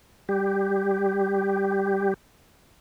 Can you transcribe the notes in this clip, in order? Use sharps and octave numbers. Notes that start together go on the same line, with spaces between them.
G3 G4